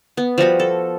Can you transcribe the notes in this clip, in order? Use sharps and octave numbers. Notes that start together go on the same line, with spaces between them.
B3
F3 G3 F#4 B5
A4